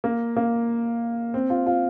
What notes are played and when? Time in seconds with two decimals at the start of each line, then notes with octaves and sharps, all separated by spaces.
0.04 A#3
0.37 A#3
1.34 C4
1.50 F4
1.66 F4